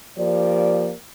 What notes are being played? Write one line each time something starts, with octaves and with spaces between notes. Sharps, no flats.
F3 A#3 G4 D5